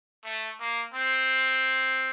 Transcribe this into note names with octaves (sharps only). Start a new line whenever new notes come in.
A3
A#3
C4